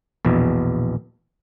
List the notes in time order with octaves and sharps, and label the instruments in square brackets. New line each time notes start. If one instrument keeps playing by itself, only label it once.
[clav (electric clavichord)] A#1 E2 B2